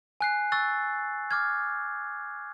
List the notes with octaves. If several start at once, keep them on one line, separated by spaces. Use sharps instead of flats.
G#5 F#6 C7
C#6 E6 F#6 A6
D6 F6 G#6